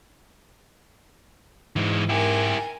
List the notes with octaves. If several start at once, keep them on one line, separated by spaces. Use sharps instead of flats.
G#2 E3 G#3
E4 G4 A#4 G#5